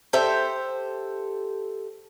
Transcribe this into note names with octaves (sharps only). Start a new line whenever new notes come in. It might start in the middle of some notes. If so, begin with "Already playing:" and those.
G4 A4 C5 E5